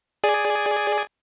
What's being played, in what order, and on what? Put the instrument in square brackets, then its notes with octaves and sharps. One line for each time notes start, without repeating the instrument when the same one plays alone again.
[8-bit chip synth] G#4 D5 G#5